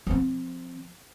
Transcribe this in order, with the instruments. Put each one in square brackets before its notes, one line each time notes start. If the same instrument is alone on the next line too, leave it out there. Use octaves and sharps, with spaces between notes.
[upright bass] F3 C4